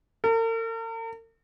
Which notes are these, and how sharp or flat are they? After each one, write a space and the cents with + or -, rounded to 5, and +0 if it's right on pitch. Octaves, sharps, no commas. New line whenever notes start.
A#4 -45